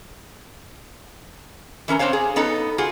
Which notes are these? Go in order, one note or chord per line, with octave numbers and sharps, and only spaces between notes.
E3 C#4 A#4 A#5
C4 D4 C5 C#5 F5
G#4
B3 C#4 D#4 A4
F4 F#4 G#4